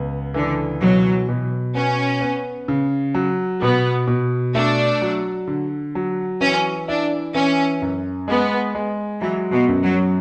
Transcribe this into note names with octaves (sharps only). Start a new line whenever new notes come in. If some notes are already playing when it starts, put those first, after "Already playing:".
Already playing: C#2 B3
D3 E3
B2 F#3
B2
B3 C#4
B3
C#3
F#3
B2 B3
B2
A3 D4
F#3
D3
F#3
E3 C#4
D4 E4
E3 C#4
F#2
G#3 B3
G#3
E3 F#3
B2
F#2
F#3